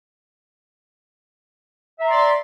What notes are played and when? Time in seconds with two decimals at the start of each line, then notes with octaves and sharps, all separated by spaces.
1.98 E5
2.02 A#5
2.06 C6
2.10 D5